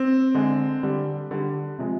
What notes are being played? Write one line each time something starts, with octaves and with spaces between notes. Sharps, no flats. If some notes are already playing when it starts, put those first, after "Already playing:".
Already playing: C4
D3 G#3
D3 G3
D3 G3
C3 F3 G#3